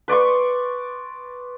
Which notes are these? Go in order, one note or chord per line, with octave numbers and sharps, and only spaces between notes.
B4 D5 C6 C#6